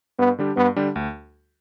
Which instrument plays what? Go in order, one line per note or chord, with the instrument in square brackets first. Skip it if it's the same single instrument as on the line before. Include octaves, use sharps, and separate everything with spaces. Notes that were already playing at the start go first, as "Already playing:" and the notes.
[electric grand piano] G2 [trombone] B3
[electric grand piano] D3 G3 D4 G4
[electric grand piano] G2 [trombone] B3
[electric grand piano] D3 G3 D4 G4
D2